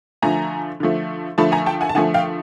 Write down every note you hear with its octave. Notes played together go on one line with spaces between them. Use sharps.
D3 F3 A3 G#5 A#5
D3 F3 A3
D3 F3 A3 A5 B5
G#5 A#5
G5 A5
F#5 G#5
A5
D3 F3 A3 F#5 G#5
F5 G5